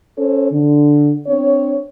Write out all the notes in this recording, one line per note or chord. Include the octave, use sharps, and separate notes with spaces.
C#4 A4 C5 C#5
D3
C4 D4 C#5